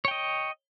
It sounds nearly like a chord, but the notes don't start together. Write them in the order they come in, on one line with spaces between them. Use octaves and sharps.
C#5 G5 D#5